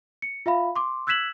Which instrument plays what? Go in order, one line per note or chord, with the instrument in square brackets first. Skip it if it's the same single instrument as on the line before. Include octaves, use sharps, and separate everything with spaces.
[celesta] C#7
F4 E5 F5 B5
C6 D6
E6 F#6 G#6 B6 E7 F#7